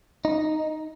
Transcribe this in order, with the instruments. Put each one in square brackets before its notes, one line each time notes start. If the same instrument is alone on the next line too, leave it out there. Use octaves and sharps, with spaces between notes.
[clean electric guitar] D#4